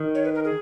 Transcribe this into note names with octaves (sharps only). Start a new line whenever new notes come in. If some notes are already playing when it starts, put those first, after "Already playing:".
Already playing: D#3
C#5
B4
A#4
G#4